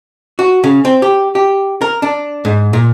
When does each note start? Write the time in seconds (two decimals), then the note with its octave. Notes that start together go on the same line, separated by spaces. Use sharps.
0.39 F#4
0.64 C#3
0.85 C4
1.02 G4
1.35 G4
1.81 A#4
2.02 D4
2.45 G#2
2.73 A#2